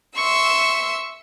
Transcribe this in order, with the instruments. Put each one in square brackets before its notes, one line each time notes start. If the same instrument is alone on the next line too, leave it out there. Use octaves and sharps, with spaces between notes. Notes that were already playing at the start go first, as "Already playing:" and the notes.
[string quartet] E5 C6 E6 [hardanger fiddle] C#6